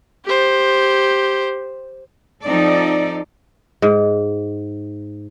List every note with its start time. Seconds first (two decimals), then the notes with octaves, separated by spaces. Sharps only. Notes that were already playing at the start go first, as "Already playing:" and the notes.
0.25 G4 C5
2.44 F3 C4 D#4 A4 D5
3.82 G#2